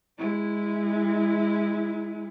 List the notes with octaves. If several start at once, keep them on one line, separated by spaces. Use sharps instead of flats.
G#3 E4